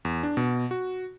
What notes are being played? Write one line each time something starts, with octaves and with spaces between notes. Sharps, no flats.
E2
D4
B2
F#4